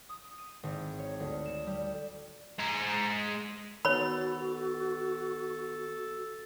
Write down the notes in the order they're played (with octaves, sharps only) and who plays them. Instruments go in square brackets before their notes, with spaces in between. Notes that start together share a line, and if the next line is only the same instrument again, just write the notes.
[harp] D#6
D#7
G#1
C#5
D2
E7
G3
[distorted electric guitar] G#3 A#5
[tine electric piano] D#3 B3 [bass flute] F#4 [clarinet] A4 [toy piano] C#5 B5